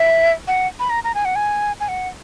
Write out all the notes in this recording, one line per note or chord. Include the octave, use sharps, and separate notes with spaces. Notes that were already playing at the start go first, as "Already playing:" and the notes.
Already playing: E5
F#5
B5
A#5
A#5
G#5
F#5
G#5
G#5
F#5